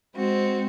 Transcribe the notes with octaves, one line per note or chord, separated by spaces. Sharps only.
G#3 C4 F#4